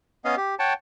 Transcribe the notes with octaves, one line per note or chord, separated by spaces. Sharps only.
B3 C#4 D#5 F5
G4
C#5 F#5 G5 A5